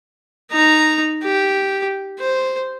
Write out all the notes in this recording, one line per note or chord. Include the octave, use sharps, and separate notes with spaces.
D#4 A#5
G4
C5